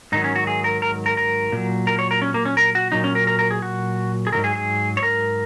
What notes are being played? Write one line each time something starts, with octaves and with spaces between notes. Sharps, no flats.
G#2 D#3 F#3 D#4
C#4
F#4
G#4
A#4
A#4
A#4
A#4
A#2 F#3
A#4
C#5
A#4
C#4
A#3
C#4
A#4
F#4
A#2 F#3 D#4
C#4
A#4
A#4
A#4
G#4
F#4
G#4
G#2 D#3 F#3 A#4
G#4
G#4
C#5
A#4